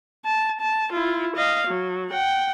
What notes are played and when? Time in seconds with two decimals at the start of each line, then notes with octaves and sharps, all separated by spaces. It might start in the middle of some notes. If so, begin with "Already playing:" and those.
0.25 A5
0.60 A5
0.92 E4 F4
1.36 D#5 F5
1.67 F#3
2.12 F#5 G5